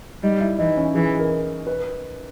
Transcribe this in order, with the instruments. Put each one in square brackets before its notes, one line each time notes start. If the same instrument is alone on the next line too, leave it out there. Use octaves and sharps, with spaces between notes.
[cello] G3 [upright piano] D#4
[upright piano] E4
[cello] E3 [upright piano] D#4
[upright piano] C#4
[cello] E3 [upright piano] G#4
[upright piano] A#4
B4